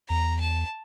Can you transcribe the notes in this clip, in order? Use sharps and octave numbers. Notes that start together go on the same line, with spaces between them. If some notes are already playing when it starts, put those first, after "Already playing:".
E2 A#5
A5